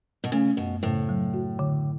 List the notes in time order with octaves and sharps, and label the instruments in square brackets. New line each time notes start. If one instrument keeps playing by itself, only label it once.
[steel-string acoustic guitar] B2
[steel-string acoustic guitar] C#3 [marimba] A3
[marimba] F#2 [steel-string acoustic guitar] B2
[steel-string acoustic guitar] A2 [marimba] C#3
[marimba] F#3
F#4
D3